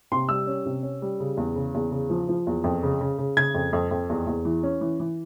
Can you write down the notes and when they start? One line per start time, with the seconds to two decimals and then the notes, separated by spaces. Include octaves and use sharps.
0.12 C3 C6
0.29 G3 E6
0.47 C#4
0.66 C3
0.83 C#4
1.02 G3
1.20 C#3
1.37 E2
1.56 C#3
1.74 E2
1.91 C#3
2.10 F3
2.29 F3
2.47 E2
2.64 F2
2.83 C#3
3.01 C#3
3.18 C#3
3.37 C#3 G#6
3.54 F2
3.73 F2
3.91 F2
4.10 E2
4.27 E2
4.45 E3
4.63 C#4
4.81 E3
5.00 E3